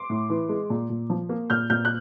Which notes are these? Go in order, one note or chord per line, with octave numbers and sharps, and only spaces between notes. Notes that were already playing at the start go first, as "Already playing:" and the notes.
Already playing: C6 D6
A2
E3
G#3
A#2
A#2
F3
A#3
A#2 F6 G6
A#2 F6 G6
F#6